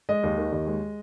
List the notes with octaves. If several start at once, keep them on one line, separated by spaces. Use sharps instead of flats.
G#3 D#5
D#2
D#3
D#2
G#3